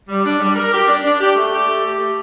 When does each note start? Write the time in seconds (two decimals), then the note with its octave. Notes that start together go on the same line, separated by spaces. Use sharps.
0.09 G3
0.24 D4
0.40 G3
0.56 A#4
0.72 G4
0.87 D4
1.04 D4
1.20 G4
1.36 A3
1.51 G4
1.67 A3
1.84 G4
1.99 A3